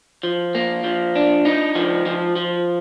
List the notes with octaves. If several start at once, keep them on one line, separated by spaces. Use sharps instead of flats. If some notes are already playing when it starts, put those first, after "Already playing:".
F3
A#3
F3
D4
D#4
F3
F3
F3